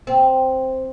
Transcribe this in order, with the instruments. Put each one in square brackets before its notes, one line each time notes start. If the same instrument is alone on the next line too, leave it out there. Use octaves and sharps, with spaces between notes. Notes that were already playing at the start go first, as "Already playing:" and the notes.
[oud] C4